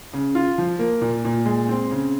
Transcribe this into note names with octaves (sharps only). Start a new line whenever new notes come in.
C#3
F4
F3
A#3
A#2
A#2
G#3
C4
C#3